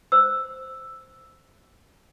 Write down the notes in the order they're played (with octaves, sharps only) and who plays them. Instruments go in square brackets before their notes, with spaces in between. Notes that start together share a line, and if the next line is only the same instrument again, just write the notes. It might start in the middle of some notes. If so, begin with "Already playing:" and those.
[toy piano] C5 E6